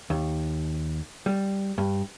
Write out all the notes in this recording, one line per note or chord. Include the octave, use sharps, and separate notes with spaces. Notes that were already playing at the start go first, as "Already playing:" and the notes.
D#2
G3
G2